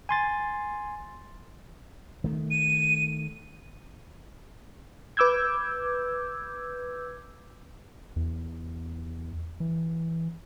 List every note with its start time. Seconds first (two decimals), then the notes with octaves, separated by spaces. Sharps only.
0.09 G#5 C6 A6
2.24 D#3 A3
2.51 D#7
5.17 B4 D6 E6 G6 G#6
8.16 E2
9.60 E3